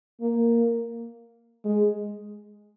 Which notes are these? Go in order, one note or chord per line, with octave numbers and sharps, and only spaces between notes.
A#3
G#3